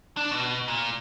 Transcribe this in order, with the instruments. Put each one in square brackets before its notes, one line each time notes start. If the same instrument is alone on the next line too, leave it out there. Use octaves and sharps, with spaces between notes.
[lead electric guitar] D4
B2
A#2